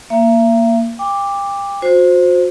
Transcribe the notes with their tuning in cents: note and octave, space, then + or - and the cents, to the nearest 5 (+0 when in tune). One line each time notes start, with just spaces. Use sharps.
A#3 +0 E5 +40
G5 +35 D6 +0
F#4 -40 C5 +0